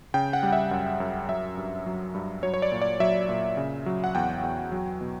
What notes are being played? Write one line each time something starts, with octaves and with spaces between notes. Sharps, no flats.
C#3 G5
F#5
G3
E5
F#2
F#2
F#3 E5
G2
F#3
G2
F#3 C#5
C#5
D5
A#2
D5
F#3 E5
A#2
C#3
F#3
F#5
E2 G5
E2
F#3
B2